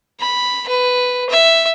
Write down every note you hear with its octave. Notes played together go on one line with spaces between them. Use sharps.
B5
B4
E5